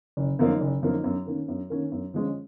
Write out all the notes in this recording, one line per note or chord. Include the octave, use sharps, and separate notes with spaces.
F#1
F#2 F3 A#3 D#4
F#1
F#2 F3 A#3 D#4
F#2
D#3 A#3 C#4
F#2
D#3 A#3 C#4
F#2
F3 G#3 C#4